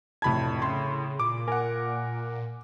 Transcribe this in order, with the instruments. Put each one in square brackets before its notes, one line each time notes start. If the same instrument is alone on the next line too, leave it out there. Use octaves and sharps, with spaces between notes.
[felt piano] F1 A5 [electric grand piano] A2 B5 G#6
[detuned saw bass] C#3 [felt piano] C6
[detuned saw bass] A#2 [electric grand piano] D6
[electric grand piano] A#4 F#5 [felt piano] G#5